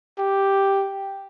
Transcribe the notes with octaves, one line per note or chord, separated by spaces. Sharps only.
G4